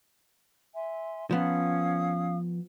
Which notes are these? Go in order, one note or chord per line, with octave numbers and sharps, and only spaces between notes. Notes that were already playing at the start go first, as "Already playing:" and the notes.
E5 G#5 C6
F3 B3 C#4 F5 D#6